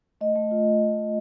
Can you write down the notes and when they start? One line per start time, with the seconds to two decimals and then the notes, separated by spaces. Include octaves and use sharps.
0.21 A3 D#5
0.36 A3
0.51 F4